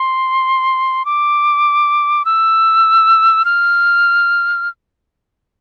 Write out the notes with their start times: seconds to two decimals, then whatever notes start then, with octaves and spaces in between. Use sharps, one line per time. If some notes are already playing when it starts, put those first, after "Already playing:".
Already playing: C6
1.05 D6
2.25 E6
3.45 F6